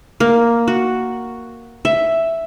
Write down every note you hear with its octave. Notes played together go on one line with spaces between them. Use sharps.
A#3
F#4
E5